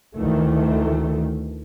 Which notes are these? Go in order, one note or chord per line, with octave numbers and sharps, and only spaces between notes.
D2 D#3 E3 A3